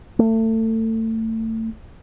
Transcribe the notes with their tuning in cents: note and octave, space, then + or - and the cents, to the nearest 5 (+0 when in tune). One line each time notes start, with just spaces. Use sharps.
A3 +30